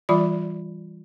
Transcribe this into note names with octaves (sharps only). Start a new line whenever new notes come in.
E3 G3 F4 D5 B5